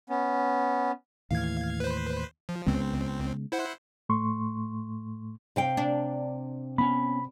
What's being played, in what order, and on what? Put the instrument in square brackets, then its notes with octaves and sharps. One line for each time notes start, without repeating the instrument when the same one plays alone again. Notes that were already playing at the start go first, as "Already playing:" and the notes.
[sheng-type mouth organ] B3 C#4
[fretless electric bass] D#2 A2 E3 [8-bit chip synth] F5 G#6
[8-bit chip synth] B4 C5
F3
[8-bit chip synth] C#2 C4 [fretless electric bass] C#3 G#3 B3
[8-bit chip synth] E4 C5 F#5
[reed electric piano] A2 A3 C6 C#6
[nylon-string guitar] C3 F5 G5
[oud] D4
[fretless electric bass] B3 C#4 [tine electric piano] B5